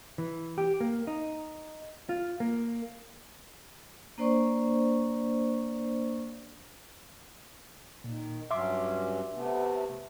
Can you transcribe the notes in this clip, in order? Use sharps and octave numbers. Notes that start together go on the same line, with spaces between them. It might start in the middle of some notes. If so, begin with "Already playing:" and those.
E3
G4
A#3
D#4
F4
A#3
A#3 D4 C5 D5 C#6
A#2 D#3
G2 F#3 C#4 E5 C6 D6
C3 A3 B3